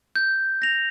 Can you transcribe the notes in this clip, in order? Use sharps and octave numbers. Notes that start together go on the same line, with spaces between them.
G6
A#6 F7